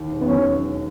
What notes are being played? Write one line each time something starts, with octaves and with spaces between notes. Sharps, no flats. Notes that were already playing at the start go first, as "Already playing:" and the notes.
Already playing: D#2
E1
B3
F#3 C#4